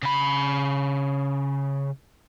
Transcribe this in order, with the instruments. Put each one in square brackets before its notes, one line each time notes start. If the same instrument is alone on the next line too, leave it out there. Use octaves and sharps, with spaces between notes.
[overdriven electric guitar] C#3 B5